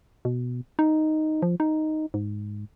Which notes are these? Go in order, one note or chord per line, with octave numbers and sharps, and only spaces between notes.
B2
D#4
F3
D#4
G#2